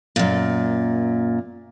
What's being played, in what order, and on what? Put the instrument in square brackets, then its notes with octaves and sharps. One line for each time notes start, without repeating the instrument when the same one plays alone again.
[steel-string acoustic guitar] F#2 A#2